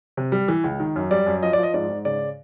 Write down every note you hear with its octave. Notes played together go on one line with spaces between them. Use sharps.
C3
G3
E3
C#2
D#3
F#2
G3 D5
F#2
F3 D#5
D5
F3
D#5
G#2 D5
G#2
C#3 D5